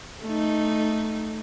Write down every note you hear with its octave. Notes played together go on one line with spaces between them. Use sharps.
A3 D#4